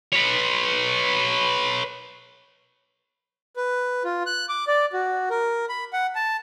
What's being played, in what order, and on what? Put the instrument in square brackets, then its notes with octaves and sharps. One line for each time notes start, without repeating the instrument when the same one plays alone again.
[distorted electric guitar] B4 C#5
[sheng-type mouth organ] B4
F4
F#6
D6
D5
F#4
A#4
B5
F#5
A5